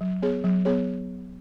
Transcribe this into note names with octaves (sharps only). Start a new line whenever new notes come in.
F#3
B3 G#4 C#5
F#3
B3 G#4 C#5